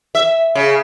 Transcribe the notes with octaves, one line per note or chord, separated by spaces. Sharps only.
E5
C#3